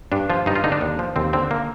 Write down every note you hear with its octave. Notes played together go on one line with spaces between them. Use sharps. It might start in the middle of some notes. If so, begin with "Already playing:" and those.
G2 D4
F3 F4
G2 D#4
F4
D3 D#4
D4
D#2
F3
D#2 C4
D3 C4
A#3